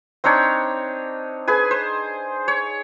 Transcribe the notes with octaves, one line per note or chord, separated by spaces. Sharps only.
C4 D4 D#4 C#5
G#4 B4 G#5
C5
C#5